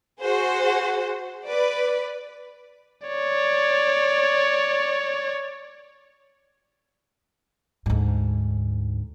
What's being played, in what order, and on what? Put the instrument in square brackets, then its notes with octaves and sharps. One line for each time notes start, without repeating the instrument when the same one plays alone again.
[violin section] F#4 G#4 C5
B4 D5
[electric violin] C#5 D5
[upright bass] D2 G#2